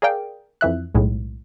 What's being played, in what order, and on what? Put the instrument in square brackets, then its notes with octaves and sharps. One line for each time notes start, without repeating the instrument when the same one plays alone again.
[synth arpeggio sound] G#4 A#4 D5 F5 G5
F2 E3 E5 F#6
B1 A2 G#3